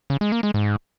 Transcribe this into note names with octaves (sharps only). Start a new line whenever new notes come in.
C#3
G#3
A#3
G#3
G#2